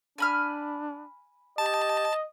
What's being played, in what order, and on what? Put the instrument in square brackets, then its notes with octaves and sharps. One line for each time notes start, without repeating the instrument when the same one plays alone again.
[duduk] D4 [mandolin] G#5 B5 F6
[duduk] G4 [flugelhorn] D#5 [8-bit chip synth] A5